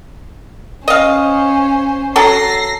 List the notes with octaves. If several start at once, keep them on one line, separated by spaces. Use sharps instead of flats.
C#4 C5 D#5 F5
F#3 A4 A#6 C7